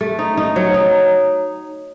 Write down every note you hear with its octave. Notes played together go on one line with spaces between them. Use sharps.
A3
D#4
D#4
F#3
D#4